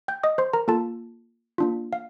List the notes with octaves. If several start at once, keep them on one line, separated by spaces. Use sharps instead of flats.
G5 G6
D#5 D#6
C5 C6
A#4 A#5
A#3 F4 A4 A5
A#3 D4 F4
F5